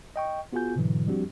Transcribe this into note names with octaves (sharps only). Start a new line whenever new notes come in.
D#5 G5 C#6
B3 F4 F#4 G#4 G#5 G6
G#2 B2 D3 E3 F#3
F3 G3 C4 D4 F#4 G4